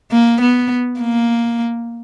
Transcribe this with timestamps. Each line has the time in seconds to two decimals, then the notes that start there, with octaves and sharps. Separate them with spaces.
0.12 A#3
0.41 B3
1.00 A#3